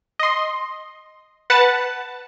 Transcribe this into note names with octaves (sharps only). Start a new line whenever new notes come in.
D#5 C6
B4 F#5 A5